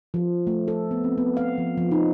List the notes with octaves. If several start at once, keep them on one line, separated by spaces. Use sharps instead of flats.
F3
A3
A4
B3
C4
B3
F5
F3
F3
D#4